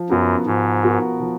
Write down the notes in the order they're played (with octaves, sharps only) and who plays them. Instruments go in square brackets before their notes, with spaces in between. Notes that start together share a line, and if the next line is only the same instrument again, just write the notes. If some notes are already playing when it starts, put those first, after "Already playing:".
Already playing: [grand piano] F3
[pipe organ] F#2 [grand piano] B3 F#4 A#4
[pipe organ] G#2 [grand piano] F3
[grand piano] B3 F#4 A#4
F3